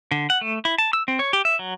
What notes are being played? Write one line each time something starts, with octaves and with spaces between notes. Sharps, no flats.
D3
F#5
A3
E4
A5
E6
C4
C#5
G4
E5
F#3